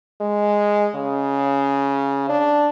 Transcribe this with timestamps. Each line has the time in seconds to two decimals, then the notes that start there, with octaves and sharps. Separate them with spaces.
0.21 G#3
0.95 C#3
2.29 D4